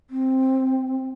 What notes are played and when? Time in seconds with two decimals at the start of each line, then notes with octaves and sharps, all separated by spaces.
0.10 C4